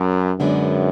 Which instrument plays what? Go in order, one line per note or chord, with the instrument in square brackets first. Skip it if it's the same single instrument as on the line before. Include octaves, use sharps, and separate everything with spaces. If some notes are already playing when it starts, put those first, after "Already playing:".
Already playing: [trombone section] F#2
[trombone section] F#2 [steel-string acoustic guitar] D3 G#3 B3 D4